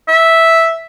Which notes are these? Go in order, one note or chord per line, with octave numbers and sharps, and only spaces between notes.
E5